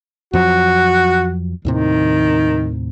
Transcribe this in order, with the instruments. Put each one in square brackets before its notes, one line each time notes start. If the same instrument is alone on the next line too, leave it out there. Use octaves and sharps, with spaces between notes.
[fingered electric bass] F2 F3 F#3 [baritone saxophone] F#4
[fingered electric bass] D#2 A2 C3 [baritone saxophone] D#3